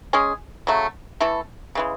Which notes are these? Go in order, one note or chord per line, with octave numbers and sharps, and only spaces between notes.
G#3 C#4 G#4
C#3 F#3 A3
E3 A3 E4 A4
C#3 E3 G#3